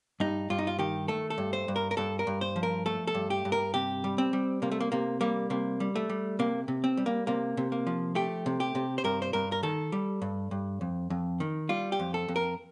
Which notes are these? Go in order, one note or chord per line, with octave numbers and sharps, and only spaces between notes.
G2 D#4
G2 F4
D#4
F4
D#3 G4
A3 A4
A4
G2
C5
G2
A#4
A#4
G2 A4
A#4
G2
C5
F3
A#4
A3 A4
A4
G2
G4
G2
A#4
C3 G4
G3
C4
G3
C3 A#3
A3
A#3
C3 A#3
G3 A#3
C3 A#3
G3
A3
G3
C3 A#3
C3
C4
G3
A#3
C3 A#3
C3
A#3
F3
A3 G4
C3
G4
C3
C5
G2 A#4
C5
G2 A#4
A#4
D#3 A4
G3
G2
G2
F2
F2
D#3
G3 F4
G4
F2
A4
F2
A#4